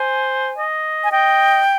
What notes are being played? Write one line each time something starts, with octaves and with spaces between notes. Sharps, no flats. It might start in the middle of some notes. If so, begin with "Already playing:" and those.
Already playing: C5 G#5
D#5
G#5
D#5 G5